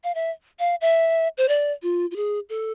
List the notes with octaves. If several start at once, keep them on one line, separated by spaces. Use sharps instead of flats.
F5
E5
F5
E5
C5
D5
F4
F4
G#4
A4